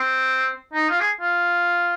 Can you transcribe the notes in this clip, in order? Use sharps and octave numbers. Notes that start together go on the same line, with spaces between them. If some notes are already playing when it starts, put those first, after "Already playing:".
Already playing: C4
D#4
F4
G#4
F4